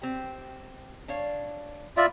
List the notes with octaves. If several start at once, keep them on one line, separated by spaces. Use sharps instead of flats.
C4 G4
D4 C#5 F5
E4 F4 D5 E5